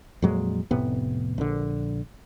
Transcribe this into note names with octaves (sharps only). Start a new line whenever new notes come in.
F2 A#2 F#3 G#3
F1 A2 C3 B3
A#1 D3